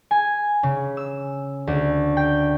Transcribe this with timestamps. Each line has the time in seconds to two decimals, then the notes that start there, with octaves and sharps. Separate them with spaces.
0.11 G#5
0.63 C#3
0.97 E6
1.67 D2
2.17 G5